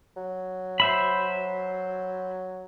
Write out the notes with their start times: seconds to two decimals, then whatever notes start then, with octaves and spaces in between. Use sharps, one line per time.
0.16 F#3
0.80 C5 E5 B5